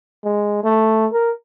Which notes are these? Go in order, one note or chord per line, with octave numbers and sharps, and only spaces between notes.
G#3
A3
A#4